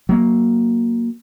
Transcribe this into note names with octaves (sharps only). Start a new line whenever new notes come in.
F#3 A#3